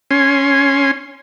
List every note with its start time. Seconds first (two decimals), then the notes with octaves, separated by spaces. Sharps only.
0.11 C#4 G#5 C6